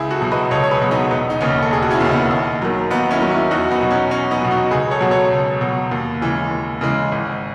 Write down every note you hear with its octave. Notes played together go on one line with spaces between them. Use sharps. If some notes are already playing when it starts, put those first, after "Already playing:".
Already playing: C#2 E4 G#4
F#4 A4
B2 F#3
B4 D#5
C#2 A4 C#5
C#5
G#4 B4
B2 F#3
B3 D#4
E1 B3
D#4
D#2 C#3 C#4
A4
E1 G#4
F#4
C#4 E4
D#2 C#3
B3 D#4
D#2
D#3 F#3
D#2 B3 D#4
C#4 E4
D#3 F#3
C#4 E4
E2 D#4 F#4
B3 D#4
B2 F#3
C#4
E2 C#4
B3 D#4
B2 F#3
D#4 F#4
C#2 G#4 B4
A4 C#5
B2 F#3
A4 C#5
C#2
B2 F#3
D#2
C#3 E3 G#3
D#2
C#3 E3 G#3
G#1